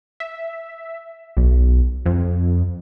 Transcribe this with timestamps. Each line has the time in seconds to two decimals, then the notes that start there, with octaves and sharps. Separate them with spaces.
0.20 E5
1.37 B1
2.06 F2